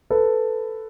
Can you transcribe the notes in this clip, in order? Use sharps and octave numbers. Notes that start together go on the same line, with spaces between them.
A4 B4